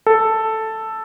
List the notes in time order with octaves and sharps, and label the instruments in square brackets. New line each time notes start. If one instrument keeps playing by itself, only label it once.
[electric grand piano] A4